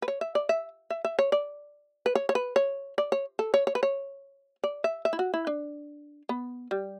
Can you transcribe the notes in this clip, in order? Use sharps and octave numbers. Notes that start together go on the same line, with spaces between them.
B4
C#5
E5
D5
E5
E5
E5
C#5
D5
B4
C#5
C#5
B4
C#5
D5
C#5
A4
C#5
C#5
B4
C#5
D5
E5
E5
E4
F#4
E4
D4
B3
G3